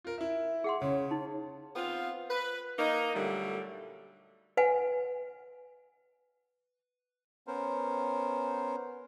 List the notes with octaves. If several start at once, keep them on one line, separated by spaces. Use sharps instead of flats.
F4 A#4
E4 E5
G#4 F#5 C6
C#3 C#5
D#4
B3 C4 F4
B4
A#3 D#4
A#2 D3 F#3 G3 A3
B4 F#5 G#5
B3 C#4 A#4 C5